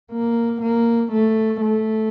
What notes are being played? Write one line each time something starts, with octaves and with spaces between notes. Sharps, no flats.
A#3
A#3
A3
A3